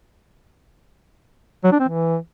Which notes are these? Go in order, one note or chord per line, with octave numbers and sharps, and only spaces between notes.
F#3
D4
C4
E3